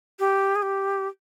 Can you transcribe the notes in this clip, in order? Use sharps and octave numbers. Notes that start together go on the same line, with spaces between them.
G4
G#4
G4